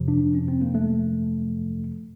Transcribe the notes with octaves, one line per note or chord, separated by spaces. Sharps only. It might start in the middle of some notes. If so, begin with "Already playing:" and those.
Already playing: F2 C3 F3
D4
C#4
C4
A#3
A3